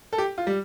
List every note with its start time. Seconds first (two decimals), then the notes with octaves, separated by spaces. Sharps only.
0.13 A4
0.18 G4
0.38 F4
0.47 G3